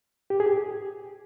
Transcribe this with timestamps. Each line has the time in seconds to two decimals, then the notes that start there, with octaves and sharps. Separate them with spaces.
0.30 G4
0.40 G#4
0.46 G4